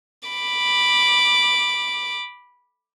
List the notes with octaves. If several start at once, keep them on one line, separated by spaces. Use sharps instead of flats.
B5 D6